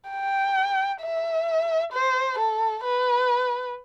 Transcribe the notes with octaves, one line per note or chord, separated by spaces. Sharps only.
G5
E5
C5
A4
B4